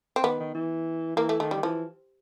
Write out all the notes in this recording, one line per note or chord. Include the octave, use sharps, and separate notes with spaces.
C4
D#3 B3
D#3
E3
E3 A#3
A3
D#3 A3
G3
D#3
E3 F3